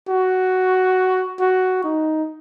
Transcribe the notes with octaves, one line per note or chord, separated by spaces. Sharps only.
F#4
F#4
D#4